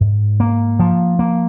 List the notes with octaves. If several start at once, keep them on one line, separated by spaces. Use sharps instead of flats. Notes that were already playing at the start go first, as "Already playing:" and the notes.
G#2
A#3
F3
A#3